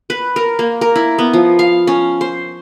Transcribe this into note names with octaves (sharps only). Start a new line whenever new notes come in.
B4
A#4
A#3
A#4
E4
B3
F3
F5
C#4
C5